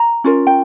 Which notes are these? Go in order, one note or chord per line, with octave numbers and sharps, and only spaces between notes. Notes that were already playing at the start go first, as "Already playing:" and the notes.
Already playing: A#5
C#4 F4 A#4
G5